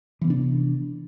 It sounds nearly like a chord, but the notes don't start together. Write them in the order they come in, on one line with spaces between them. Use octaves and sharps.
E3 B3 C3 D4